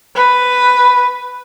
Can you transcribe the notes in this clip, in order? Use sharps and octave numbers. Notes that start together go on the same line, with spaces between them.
B4